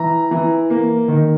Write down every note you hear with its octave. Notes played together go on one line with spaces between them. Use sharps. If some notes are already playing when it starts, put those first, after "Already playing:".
Already playing: E3 A#5
E3
A#3
D#3